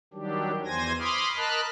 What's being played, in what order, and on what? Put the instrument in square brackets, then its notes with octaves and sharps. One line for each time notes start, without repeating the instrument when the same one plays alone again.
[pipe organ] D#3 F#3 G3 D4 G4
E2 E3 C5 G#5 G#6 A#6
B5 C6 D6 D#6 F6
A#4 D#5 A5 B5 F6 F#6